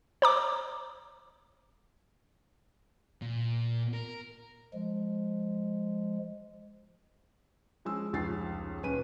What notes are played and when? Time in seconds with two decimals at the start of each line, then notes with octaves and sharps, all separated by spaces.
0.22 C5 A#5 D6
3.22 A#2
3.94 A#4
4.74 F3 G#3
7.85 F3 G#3 C#4 E6
8.13 F1 C#2 C#4 A6 C7
8.83 D#1 C#4 B4 D#7